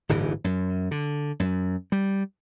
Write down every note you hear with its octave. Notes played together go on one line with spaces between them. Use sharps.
D1 G1 G#2 E3
F#2
D3
F#2
G3